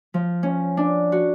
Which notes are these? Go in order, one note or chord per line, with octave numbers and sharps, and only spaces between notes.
F3
C#4
D4
F#4